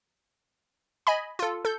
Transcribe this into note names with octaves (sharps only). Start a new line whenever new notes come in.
D#5 G#5 B5
F4 A4
A4 G6